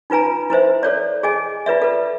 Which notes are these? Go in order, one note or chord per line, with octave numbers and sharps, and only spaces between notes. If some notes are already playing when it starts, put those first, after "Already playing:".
D#4 F4 B4 G#5 A#5
E4 B4 C5 E5
A4 C#5 D5
G#4 D#5 G#5
F4 B4 D5 E5
A4 B4